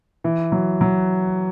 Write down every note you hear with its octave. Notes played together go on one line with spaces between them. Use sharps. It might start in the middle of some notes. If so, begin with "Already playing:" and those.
E3
F#3
F#3